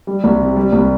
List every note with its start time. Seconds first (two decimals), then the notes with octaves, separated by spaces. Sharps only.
0.07 G3
0.24 C2
0.41 C3
0.56 G3
0.72 C2